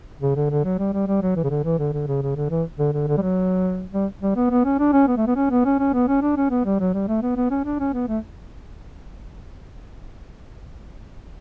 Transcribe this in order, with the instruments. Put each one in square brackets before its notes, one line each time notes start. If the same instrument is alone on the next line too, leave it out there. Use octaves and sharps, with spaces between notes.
[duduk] C#3
D3
D3
F#3
G3
G3
G3
F#3
E3
C#3
D3
E3
D3
D3
C#3
C#3
D3
E3
D3
D3
D3
G3
F#3
G3
G3
B3
B3
C#4
D4
C#4
B3
A3
B3
C#4
B3
C#4
C#4
B3
C#4
D4
C#4
B3
G3
F#3
G3
A3
B3
B3
C#4
D4
C#4
B3
A3